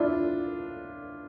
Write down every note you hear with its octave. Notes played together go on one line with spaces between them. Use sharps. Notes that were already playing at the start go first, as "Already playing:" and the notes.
Already playing: D4 E4 F4